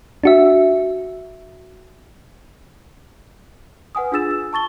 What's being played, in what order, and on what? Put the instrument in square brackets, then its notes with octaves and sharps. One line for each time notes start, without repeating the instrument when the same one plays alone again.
[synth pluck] D4 F#4 E5
[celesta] B4 F#5 G#5 D#6
D4 F4 G#4 E6 A6 E7
E6
A5 C#6 A6 G7